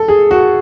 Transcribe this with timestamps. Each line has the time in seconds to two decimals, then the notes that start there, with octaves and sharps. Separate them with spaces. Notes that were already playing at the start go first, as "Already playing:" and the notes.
Already playing: A4
0.08 G#4
0.31 F#4